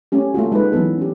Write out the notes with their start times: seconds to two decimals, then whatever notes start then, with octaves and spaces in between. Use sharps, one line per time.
0.12 A3 C#4 G4
0.34 A3 A#3 F4 F#4
0.52 G#3 D#4 B4
0.72 E3 F#3 B3 A4
0.98 C#4 G4